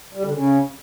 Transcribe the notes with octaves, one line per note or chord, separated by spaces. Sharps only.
G3
D3
C#3